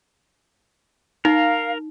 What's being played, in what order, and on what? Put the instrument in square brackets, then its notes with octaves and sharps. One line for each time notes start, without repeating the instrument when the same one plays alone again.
[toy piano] D#4 [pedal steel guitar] A#4 [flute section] F5